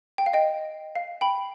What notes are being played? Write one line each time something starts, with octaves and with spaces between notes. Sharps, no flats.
G5
F5
D#5 G5
F5
G5 B5